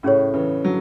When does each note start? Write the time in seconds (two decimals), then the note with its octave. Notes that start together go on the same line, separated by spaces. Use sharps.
0.03 A2 C#3 C#4 G#4 C#5
0.34 C#3 E3
0.64 D3 F#3